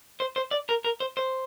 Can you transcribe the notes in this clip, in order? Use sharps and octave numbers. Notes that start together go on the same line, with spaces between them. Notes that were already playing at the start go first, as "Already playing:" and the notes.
C5
C5
D5
A#4
A#4
C5
C5